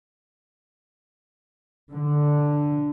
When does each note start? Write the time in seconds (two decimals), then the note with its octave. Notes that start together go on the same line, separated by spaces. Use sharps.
1.92 D3